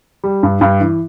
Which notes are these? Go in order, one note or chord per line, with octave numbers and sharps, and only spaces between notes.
G3
G2
G2
E3